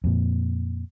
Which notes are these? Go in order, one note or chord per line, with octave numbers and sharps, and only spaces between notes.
F2 A#2